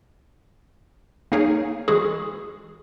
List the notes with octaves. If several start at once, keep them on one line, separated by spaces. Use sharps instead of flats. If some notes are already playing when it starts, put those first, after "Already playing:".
A#3 D#4 G#4 A#4 C#5
E3 G#3 F#4 G#4